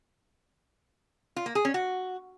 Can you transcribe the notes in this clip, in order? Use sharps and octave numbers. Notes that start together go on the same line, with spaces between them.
F4
A#3
G#4
C#4
F#4